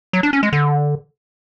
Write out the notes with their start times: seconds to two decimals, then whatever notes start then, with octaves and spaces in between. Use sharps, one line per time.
0.13 F#3
0.23 D4
0.33 C#4
0.43 G#3
0.53 D3